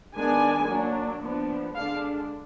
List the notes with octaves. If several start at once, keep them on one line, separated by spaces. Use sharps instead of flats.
D#3 G#3 B3 D4 G#5
F#3 A#3 D4
F3 B3 D4
D3 G#3 D4 F5